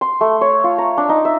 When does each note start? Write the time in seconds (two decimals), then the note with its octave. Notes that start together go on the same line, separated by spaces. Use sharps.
0.01 C6
0.21 A3
0.41 C#5
0.64 F4
0.78 A#5
0.97 D4
1.09 D#4
1.25 E5